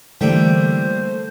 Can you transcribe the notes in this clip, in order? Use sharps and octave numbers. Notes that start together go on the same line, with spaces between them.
D3 E3 G3 A3 A#3 C5 G5